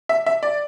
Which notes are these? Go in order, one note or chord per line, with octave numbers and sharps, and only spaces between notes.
E5
E5
D5